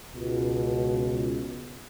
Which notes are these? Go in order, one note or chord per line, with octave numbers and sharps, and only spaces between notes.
C#2 B2